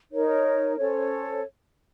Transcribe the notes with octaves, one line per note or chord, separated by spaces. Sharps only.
D#4 A#4 C#5
C#4 A4 C5 C#5